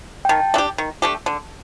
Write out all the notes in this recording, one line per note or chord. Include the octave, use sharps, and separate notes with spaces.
G5
D#3 A5
A3 D4 G4
D#3
A3 D4 G4
D3